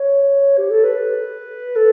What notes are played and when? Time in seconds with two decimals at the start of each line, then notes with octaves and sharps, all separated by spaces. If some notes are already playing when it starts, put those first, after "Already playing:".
Already playing: C#5
0.58 G4
0.70 A4
0.84 B4
1.76 A4